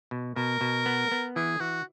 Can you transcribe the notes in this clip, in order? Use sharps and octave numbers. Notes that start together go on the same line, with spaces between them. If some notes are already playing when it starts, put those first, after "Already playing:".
B2
B2 A#4
B2
B3
B3
E3 G#4
E3 F#4